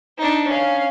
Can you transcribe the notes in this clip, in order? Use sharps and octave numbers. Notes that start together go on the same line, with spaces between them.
D4 D#4
C#4 F5